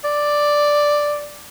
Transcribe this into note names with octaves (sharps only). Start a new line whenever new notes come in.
D5